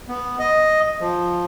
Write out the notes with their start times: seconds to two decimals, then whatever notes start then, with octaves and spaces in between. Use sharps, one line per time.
0.08 B3
0.39 D#5
1.01 F3